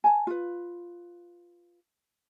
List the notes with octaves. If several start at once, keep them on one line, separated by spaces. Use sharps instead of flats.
G#5 A5
F4 B4